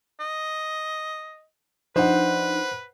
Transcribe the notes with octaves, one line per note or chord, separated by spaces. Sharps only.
D#5
F3 D4 D#4 B4 C5 F#5